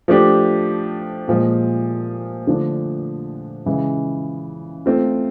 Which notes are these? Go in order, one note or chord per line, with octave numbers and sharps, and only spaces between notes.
F3 A3 D4 G4
A#2 F3 G#3
D3 F3 A3 D4
C#3 E3 G#3
A3 C4 F4